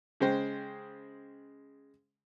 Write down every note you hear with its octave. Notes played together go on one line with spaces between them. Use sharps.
C#3 G#3 C5 G5